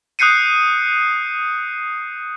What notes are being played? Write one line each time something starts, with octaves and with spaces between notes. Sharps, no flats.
D#6 F#6 G6 C7 C#7 D#7